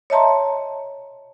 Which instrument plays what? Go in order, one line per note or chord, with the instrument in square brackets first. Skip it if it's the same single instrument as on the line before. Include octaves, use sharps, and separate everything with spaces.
[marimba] C#5 D#5 E5 A5 A#5 C6